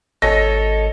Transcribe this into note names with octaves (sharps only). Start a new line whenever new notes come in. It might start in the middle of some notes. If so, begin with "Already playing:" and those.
G#1 A4 C#5 D#5 A#6